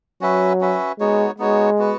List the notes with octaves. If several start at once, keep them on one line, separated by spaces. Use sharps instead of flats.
F#3 C#4 F#4 B4 E5
C#4 F#4 B4 E5
G#3 B3 D#4 F#4 C#5
G#3 B3 D#4 F#4 C#5
B3 F#4 B4